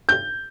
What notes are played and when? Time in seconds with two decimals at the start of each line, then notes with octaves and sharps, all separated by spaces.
0.09 G6